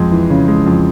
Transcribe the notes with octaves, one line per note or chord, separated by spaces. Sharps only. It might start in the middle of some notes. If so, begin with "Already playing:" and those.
Already playing: F2 G#3
E3
C#3
G#3
F2